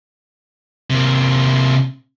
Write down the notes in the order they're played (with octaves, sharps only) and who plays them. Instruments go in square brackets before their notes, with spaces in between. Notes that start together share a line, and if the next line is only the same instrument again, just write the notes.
[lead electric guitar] C3 A#3